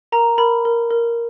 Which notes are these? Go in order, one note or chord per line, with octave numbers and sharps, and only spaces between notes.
A#4 A#5
A#4 B5
A#4
A#4